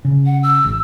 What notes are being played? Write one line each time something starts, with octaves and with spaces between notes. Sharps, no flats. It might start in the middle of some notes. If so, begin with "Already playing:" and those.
C#3
F#5
E6
G#1